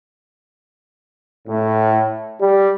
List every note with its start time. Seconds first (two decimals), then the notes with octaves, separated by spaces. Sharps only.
1.47 A2
2.40 G3